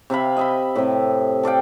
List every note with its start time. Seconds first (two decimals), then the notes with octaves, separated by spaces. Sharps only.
0.10 C3 E5 F5 B5
0.37 D#5 E5 B5
0.76 A2 C3
1.43 A4 D5 F5 G5